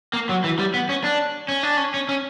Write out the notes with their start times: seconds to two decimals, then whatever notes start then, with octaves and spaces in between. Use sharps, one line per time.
0.13 A#3
0.29 F#3
0.44 E3
0.59 G3
0.74 B3
0.89 C#4
1.04 D4
1.48 C#4
1.63 D4
1.77 C#4
1.94 C#4
2.09 C#4